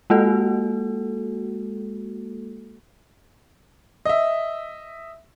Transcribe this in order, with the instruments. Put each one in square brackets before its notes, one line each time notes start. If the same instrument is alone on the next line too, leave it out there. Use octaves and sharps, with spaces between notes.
[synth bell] G#3 A#3 F#4 A4
[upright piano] D#5 E5